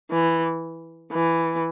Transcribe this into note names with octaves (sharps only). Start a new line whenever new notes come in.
E3
E3